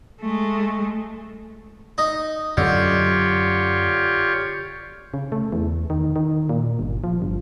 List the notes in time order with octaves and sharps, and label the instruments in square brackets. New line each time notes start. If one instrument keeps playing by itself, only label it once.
[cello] G#3 A3
[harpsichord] D#4 D#5
[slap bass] F#2 F#3 C#4 [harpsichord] D3 [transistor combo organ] F4 G4 C#5
[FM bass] C#3
A3
E2
D#3
D#3
A#2
G1
F3
G1